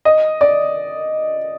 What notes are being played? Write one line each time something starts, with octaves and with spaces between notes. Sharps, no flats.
D#5
D5